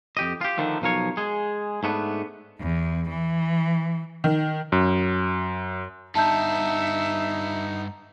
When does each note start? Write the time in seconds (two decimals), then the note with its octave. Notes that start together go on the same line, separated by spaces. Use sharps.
0.17 F2 G4 D#5
0.41 F4 G4
0.57 D3 D#3 F3 A3
0.82 B1 F3 A#4 C#5
1.17 G#3 G#4
1.83 G#2 A3 B3 D4
2.60 E2
3.09 E3
4.24 D#3
4.72 F#2
6.15 G2 B3 D#4 E5 A5 G6